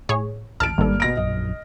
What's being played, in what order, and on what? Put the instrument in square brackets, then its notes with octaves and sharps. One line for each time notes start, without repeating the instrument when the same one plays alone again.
[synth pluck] A2 G#4 C#5
[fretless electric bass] D1 [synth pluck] A1 A5 [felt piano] F6 D7
[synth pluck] G#1 A4 [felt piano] G2 [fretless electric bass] A#3
[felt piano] B2 A#6 D7
[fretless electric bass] A#1 F#2 [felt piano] D#5